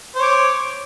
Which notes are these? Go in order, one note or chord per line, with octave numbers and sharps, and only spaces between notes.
C5 C#5 D6